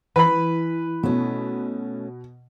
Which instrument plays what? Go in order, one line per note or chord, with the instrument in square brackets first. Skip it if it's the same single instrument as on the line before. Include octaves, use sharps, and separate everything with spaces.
[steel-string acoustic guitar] E3 [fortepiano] B4 B5
[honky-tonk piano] B2 [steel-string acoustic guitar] A3 C#4